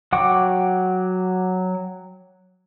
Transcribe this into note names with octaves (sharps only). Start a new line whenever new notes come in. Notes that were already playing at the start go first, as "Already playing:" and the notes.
F#3 F#5 G5 C#6 D6